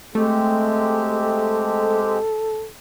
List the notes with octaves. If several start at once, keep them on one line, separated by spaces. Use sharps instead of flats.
G#3 A3 C4 G4 A4